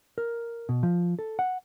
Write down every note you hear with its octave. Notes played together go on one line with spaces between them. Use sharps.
A#4
B2
F3
A4
F#5